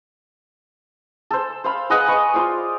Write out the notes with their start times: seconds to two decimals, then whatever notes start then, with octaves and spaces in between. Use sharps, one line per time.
1.31 A4 C5
1.64 C5 F5 B5
1.90 G#4 B4 D#5 F#5
2.08 B4 C#6
2.34 F4 C5 D5